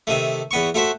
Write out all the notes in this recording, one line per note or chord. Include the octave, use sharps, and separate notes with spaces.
C3 D#3 A3
E2 B3 C#6
A3 F#4 C5 E5